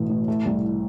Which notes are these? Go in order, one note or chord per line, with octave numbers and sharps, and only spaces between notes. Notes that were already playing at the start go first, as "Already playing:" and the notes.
Already playing: A1 B2 E3 A3
A2
A3
C2